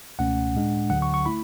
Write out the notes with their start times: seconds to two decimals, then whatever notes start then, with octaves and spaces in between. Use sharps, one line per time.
0.19 C#2 B2 A3 C#4 F#5
0.54 A2 G#3 D4
0.90 D2 D3 F#3 F#5
1.02 C#6
1.14 C#6
1.26 A3 E4 B5